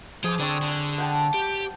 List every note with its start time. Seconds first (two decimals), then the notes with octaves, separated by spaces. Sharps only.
0.24 F3 G#4 C5 D6
0.39 D3 C4 D5 C#6
0.62 D3
0.98 F#5 G5 A5
1.34 G4